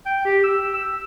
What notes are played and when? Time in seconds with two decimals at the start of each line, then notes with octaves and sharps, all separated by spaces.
0.06 G5
0.25 G4
0.44 E6
0.74 E6